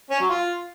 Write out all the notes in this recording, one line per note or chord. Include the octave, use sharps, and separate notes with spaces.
C#4
F#3
F4